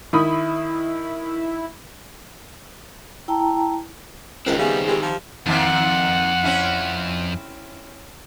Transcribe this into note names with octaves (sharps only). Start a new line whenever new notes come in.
D#3 E4 B5 D#6
E4 G5 A5 A#5
C#2 D#3 C4 A#4 C5 D#5 F5
C#3 G3 B3 E5 F5 G#5
G#3 F4 G4 A#4
F3 G#5
F2 D#3 A#3 C4 F#5
C4 C#4 E4